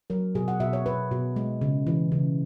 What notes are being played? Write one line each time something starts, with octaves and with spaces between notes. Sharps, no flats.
F#3 A#4
B2 G#4
F#5
B2 E5
C#5
B2 B4
B2
G#3
C#3
E3
C#3